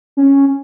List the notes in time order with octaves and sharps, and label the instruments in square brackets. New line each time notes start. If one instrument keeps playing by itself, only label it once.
[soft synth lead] C#4